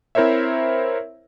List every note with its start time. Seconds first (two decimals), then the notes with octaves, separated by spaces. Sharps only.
0.15 C4 E4 A#4 C5 C#5 E5